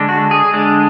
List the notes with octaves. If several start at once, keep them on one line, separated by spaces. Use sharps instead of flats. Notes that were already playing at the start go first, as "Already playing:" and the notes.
Already playing: D3 G#3 D4
F#4
G#4
D3 G#3 D4